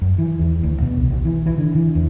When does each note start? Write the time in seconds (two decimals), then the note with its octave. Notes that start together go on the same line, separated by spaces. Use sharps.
0.02 F#2
0.18 E3
0.39 E2
0.63 D2
0.82 B2
0.97 C2
1.10 B1
1.25 E3
1.46 E3
1.58 D3
1.75 E3
1.95 E2